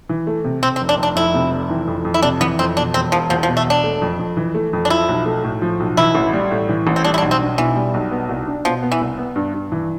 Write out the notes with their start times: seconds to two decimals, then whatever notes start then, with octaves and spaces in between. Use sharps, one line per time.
0.09 E3
0.27 A3
0.45 C3
0.63 C3 C4
0.76 C4
0.81 F1
0.89 D4
0.98 F1
1.03 D4
1.16 F2 E4
1.34 C3
1.52 F1
1.70 E3
1.87 F2
2.05 F2
2.14 E4
2.22 C3 D4
2.41 E3 B3
2.59 F2 C4
2.77 B2 D4
2.94 E1 C4
3.12 E1 F3
3.30 E2 F3
3.43 F3
3.48 B2
3.57 A3
3.66 E1 D4
3.84 A3
4.02 F2
4.19 F2
4.37 E3
4.55 A3
4.73 F2
4.85 D4
4.90 F3 E4
5.09 B1
5.26 A3
5.44 A2
5.62 F3
5.80 B1
5.97 E3 E4
6.15 A1
6.33 G3
6.51 A2
6.69 E3
6.87 A1
6.96 C4
7.04 G3 D4
7.14 E4
7.18 D4
7.22 B1
7.31 C4
7.40 D4
7.58 B2 E3
7.76 G3
7.94 B1
8.11 B3
8.29 C2
8.47 D4
8.65 B2 F3
8.82 B3
8.92 E3
9.01 C2
9.18 B3
9.36 G2
9.54 G2
9.72 E3